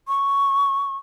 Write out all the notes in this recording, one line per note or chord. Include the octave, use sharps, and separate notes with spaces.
C#6